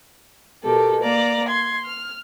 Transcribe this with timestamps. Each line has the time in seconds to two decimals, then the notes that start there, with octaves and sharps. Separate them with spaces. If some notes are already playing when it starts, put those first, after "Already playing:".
0.63 B2 G4 A4 A#4
1.01 A#3 D5 A#5
1.47 C6 G#6
1.82 F6